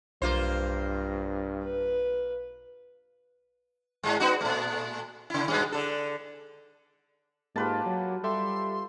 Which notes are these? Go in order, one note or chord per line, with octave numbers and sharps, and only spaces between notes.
B1 G2 A#3 F4 C5
B4
G#2 G#3
B3 D#4 F#4
A#2 A3
C#3 E4
G2 B2 G#3
D3 A4
G#2 A#3 F4 G4 B4 A5
F#3
G3 G4 A4 E5 C6